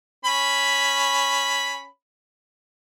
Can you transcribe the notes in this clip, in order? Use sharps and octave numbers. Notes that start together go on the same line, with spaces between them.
C#4 B5